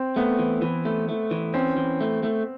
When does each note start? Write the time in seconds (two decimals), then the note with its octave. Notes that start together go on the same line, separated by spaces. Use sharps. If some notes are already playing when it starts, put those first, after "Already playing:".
Already playing: C4
0.16 A3 B3
0.39 E3
0.62 E3
0.85 A3
1.09 A3
1.31 E3
1.54 C4 C#4
1.77 E3
2.01 A3
2.23 A3